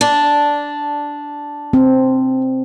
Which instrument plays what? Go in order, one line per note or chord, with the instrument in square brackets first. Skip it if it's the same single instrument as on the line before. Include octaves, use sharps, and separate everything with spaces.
[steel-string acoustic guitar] D4
[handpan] C4